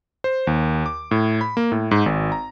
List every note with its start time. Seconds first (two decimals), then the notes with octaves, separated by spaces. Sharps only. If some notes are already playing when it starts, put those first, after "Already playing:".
0.24 C5
0.47 D#2
0.86 D6
1.11 A2
1.41 B5
1.57 A#3
1.72 A2
1.91 G#2
2.06 G#1
2.32 A#5